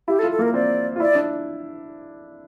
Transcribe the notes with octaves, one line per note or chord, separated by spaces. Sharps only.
E4 G4
A4
F4
A4
A#3 A#4
C4 D5
F4
E4 D5
D4